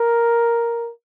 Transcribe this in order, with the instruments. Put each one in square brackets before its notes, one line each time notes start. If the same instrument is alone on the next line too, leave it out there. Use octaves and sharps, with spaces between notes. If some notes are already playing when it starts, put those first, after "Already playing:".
Already playing: [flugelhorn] A#4